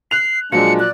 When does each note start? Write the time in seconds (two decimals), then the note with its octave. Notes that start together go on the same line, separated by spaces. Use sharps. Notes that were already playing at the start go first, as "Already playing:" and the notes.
0.11 F#6 C7 F7
0.52 A#2 F3 F#3 G#3 D4 C#7
0.79 D5 F#6